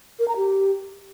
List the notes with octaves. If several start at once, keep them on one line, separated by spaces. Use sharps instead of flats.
A#4
A#5
G4